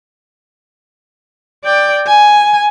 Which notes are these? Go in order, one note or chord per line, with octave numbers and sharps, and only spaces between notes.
D5 G5
G#5